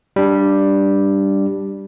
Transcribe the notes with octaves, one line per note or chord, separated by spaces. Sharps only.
G3 D4